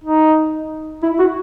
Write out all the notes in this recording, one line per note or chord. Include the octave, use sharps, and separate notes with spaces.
D#4
E4
F#4